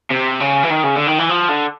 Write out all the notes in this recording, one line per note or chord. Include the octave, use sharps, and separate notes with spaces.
C3
C#3
E3
D#3
C#3
D3
D#3
E3
F3
D3